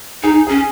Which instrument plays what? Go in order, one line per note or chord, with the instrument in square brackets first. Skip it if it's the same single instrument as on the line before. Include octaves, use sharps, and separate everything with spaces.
[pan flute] D#4 [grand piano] G#4
[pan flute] C#4 [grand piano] G#4